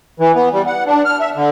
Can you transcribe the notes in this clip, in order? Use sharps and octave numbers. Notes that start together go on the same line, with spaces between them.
E3
B3
G3
F#5
D4
F6
E5
D3